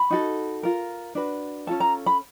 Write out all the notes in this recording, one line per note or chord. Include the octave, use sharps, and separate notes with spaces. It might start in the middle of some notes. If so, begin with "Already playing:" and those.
Already playing: B5
D#4 F#4 A4
F4 A#4
D4 F#4 B4
C#4 F4 A4 A5
A#5
B5